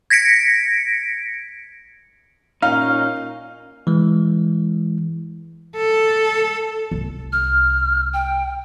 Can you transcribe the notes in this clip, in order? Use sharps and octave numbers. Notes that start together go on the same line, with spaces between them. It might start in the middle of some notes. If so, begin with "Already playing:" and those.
G#6 A#6 B6 C#7 D7
A#2 C#4 D#4 F5 F6
E3 G#3
A4
C2
F6
G5